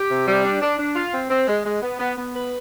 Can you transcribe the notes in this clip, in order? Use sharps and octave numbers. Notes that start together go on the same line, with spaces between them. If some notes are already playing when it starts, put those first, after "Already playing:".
Already playing: G4
C3
G3
D4
D4
D4
F4
C4
C4
G#3
G#3
B3
B3
B3
B4